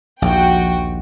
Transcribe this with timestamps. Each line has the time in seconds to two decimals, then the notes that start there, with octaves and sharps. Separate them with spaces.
0.22 A#1 D#2 F3 F#4 G5